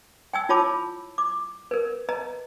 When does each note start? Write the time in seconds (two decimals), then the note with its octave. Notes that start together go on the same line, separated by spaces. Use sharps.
0.33 G5 G#5 E6
0.49 E4 F4 C#5 A5 B5 D6
1.18 D6
1.71 A#4 B4
2.09 B4 D#5 A#5